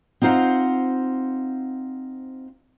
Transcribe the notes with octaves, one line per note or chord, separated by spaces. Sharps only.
C4 D#4 F4 C5 F#5